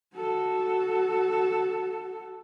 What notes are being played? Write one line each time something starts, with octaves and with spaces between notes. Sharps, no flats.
F#4 A4